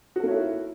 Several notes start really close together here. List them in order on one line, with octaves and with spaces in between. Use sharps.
F#4 A4 A#3 C#5 E4